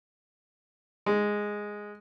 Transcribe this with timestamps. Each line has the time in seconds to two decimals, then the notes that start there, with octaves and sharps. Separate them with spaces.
1.06 G#3